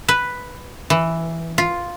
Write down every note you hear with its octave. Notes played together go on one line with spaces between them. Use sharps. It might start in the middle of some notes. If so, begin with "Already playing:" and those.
B4
E3
F4